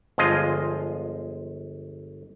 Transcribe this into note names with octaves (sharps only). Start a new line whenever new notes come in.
G1 F3 G#3 F4 D#5